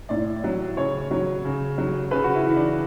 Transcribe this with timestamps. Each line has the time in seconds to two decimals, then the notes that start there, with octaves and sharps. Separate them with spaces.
0.09 A2 D5
0.44 F#3
0.77 C#3 C#5
1.11 F#3
1.45 C#3
1.78 F#3
2.11 C#3 B4
2.24 F#4
2.35 E4
2.45 E3
2.56 D4